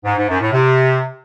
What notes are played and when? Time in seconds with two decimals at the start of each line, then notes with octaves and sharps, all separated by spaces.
0.05 G#2
0.17 G#2
0.28 F#2
0.40 A2
0.52 C3